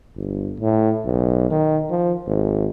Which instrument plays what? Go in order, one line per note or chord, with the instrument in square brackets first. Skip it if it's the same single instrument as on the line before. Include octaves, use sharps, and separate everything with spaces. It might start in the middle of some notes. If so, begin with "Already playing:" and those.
[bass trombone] G1
A2
B1
D#3
F3
G#1